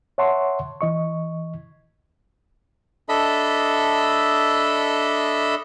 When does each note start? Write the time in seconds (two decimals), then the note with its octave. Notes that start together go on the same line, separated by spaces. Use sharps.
0.18 C#5 E5 F#5 A5 C6 C#6
0.81 E3 D#5 C#6
3.09 D4 A4 D#5 E5 B5